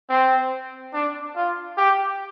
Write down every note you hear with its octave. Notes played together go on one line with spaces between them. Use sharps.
C4
D4
F4
G4